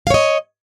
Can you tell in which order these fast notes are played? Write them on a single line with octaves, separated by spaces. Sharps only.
F5 C#5 D#5